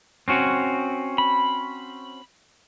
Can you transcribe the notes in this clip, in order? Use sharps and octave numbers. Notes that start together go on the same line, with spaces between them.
C4 C#4 F#4
B5